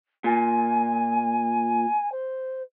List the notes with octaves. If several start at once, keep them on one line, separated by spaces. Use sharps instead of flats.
A#2 G#5
C5